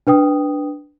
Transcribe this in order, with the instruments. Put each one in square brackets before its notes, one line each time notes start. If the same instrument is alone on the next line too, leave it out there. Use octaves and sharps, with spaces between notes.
[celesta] D4 B4 G5 D#6